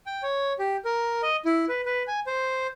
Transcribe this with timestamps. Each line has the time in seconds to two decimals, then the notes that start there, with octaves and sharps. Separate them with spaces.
0.06 G5
0.23 C#5
0.59 G4
0.85 A#4
1.22 D#5
1.45 E4
1.69 B4
1.86 B4
2.07 G#5
2.27 C5